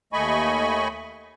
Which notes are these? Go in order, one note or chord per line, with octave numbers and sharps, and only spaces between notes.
D#2 A3 D#5 G#5 B5 C#6